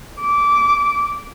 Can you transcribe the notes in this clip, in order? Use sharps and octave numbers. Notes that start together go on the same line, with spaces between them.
D6